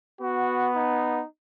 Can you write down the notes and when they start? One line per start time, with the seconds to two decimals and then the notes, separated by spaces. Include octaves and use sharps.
0.21 B3 F#4
0.76 D#4